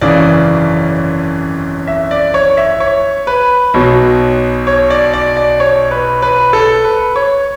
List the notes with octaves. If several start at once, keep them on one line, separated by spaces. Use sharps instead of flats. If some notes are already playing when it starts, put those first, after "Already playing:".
G#1 F#2 C#3 E3 D5
E5
D5
C#5
E5
C#5
B4
B1 B2 F#3
C#5
D5
D5
D5
C#5
B4
B4
A4
B4
C#5